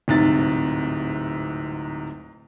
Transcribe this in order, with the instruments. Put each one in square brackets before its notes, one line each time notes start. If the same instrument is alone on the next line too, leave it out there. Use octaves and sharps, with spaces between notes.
[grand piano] D1 G#2 C3 A6